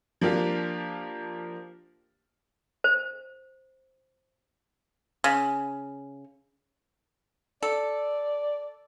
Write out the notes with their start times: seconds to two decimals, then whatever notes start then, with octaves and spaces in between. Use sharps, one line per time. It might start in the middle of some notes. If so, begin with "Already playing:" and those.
0.21 F3 A#3 D4 F4 G4
2.84 C5
5.24 C#3
7.63 A4 D5